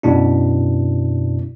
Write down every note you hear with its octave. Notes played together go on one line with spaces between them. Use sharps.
F#2 B2 D4 E4